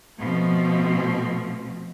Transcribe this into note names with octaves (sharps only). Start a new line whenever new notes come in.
B2 F3 A3 C4